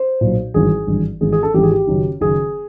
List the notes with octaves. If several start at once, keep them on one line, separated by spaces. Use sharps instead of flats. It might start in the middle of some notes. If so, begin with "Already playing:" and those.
Already playing: C5
B1 A#2
G#1 G2 E3 G#4
G#1 G2 E3
G#1 G#2 E3 G#4
G#4
A4
G#1 G#2 E3 G4
G#4
G4
F#1 F#2 D#3
F#1 F#2 D#3 G#4